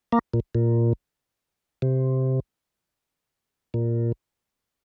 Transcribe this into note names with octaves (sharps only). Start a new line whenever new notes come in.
A#3
A#2
A#2
C3
A#2